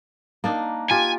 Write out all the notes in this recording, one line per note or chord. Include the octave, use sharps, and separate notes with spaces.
A#3 D4 D#4
F4 G4 G#5